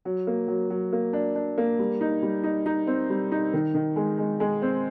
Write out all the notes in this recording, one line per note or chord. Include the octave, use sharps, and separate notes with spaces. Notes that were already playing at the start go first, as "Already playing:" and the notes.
F#3
A#3
F#3
F#3
A#3
D4
D4
A#3
G3
D#4
G3
D#4
D#4
C4
G3
D#4
D#3
D#3
G#3
G#3
G#3
C4